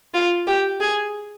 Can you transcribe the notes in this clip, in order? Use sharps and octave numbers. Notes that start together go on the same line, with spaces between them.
F4
G4
G#4